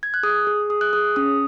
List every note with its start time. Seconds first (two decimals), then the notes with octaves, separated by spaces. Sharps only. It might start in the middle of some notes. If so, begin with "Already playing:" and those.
0.03 G#6
0.14 F#6
0.23 G#4 D#6
0.47 G#4
0.70 G#4 D#6
0.81 F#6
0.93 G#4 D#6
1.16 C#4 D#6